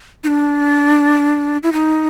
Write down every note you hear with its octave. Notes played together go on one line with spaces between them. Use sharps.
D#4
D4
E4
D#4